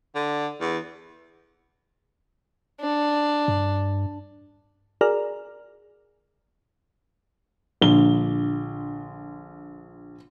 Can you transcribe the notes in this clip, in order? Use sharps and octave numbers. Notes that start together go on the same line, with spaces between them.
D3
E2
D4
G2
F#4 G#4 A#4 D5 A#5 F6
A#1 D3 G7